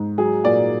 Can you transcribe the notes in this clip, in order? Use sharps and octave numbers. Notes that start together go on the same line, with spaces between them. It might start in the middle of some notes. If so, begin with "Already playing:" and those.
Already playing: G#2
F#3 G#4
A#2 D5